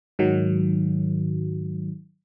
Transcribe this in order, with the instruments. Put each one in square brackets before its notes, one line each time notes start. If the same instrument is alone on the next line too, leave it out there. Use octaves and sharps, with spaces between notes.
[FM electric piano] G#2 D#3 F#3